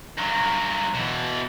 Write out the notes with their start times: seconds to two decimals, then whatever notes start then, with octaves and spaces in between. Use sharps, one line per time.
0.18 G2 F#3
0.94 B2 E3